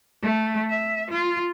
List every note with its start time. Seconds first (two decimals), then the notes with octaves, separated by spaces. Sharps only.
0.22 A3
0.69 E5
1.10 F4